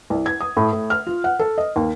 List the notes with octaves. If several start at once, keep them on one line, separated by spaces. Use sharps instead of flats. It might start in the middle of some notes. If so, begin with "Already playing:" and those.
C2
G#6
D#6
A2
A2
F6
F4
F#5
A4
D#5
D#2